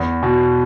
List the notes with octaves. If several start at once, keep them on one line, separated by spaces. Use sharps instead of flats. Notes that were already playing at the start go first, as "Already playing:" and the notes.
Already playing: E2
B2